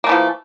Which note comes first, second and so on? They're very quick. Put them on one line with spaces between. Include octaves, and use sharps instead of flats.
A#3 A3 E3 F3